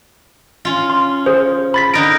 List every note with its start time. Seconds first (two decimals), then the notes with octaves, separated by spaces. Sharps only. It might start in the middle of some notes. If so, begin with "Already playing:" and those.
0.65 C#4 F4
0.90 C6
1.26 G#4 C5
1.74 B5 A6 B6
1.94 D3 D#4 A#4 D7